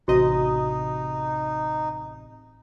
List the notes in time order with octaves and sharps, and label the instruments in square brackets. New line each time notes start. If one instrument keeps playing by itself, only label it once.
[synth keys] A1 C3 D#5 [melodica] D#4 [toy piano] F#4